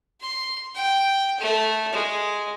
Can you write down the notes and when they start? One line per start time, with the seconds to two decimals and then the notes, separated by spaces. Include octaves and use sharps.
0.21 C6
0.75 G5
1.40 A3
1.93 G#3